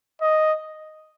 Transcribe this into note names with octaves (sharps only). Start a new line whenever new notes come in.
D#5